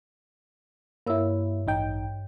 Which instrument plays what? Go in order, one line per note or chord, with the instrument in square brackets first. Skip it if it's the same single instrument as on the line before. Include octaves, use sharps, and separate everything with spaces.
[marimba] G2 C#5 E6 [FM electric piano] A#3 E4
[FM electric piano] A1 D#4 G5